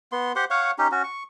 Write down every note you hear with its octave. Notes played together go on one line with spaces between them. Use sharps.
B3 C6
G4 C5 F#5 C6
C#5 F5 F#5 C#6
C#4 D#4 G4
C#4 F#4
C#6